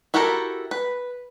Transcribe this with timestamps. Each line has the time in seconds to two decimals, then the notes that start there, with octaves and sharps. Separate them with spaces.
0.14 E4 F#4 G4 A4 A#4
0.71 B4